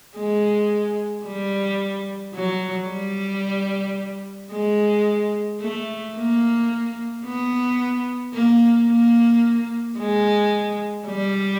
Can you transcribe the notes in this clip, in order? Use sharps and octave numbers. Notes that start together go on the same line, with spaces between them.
G#3
G3
F#3
G3
G#3
A3
A#3
B3
A#3
A#3
G#3
G3